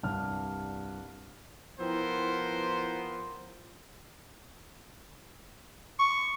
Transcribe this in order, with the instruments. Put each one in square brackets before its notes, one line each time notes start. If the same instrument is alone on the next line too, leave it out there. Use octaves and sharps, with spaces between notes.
[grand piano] C2 G2 F6
[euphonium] F3 [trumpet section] B3 A#4 C5 [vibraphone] E4 G5
[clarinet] C#6